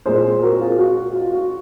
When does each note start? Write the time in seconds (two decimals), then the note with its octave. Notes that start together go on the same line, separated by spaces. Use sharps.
0.06 A#2 G#3 C4 G#4 C5
0.42 F#4 A#4
0.61 F4 G#4
0.79 F#4
1.15 F4
1.33 F#4